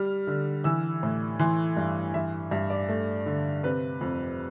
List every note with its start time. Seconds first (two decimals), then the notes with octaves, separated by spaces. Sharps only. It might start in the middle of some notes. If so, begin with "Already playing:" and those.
Already playing: G3 F6
0.27 D3
0.64 E3 E6
1.03 A2
1.39 E3 C6
1.77 G2
2.14 E3 E5
2.51 G2 E5
2.70 D5
2.89 A3
3.26 D3
3.64 C3 B4
4.01 F2